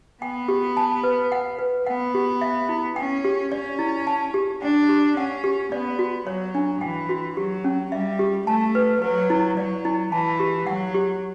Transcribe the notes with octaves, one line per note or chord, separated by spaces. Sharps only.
B3 G5
G4
A5
B4
F#5
B4
B3 F#5
G4
E5
E4
C#4 G5
G4
C#4 D5
E4
A5
G4
D4 G5
G4
C#4 F#5
G4
B3 D5
F#4
F#3 C#5
D4
E3 G5
F#4
F#3 G4
C#4
G3 E5
G4
A3 A5
B4
F#3 B4
E4
F#3 D5
E4
E3 A5
G4
F#3 F#5
G4